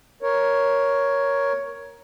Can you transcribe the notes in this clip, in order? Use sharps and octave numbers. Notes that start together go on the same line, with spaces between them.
A#4 C#5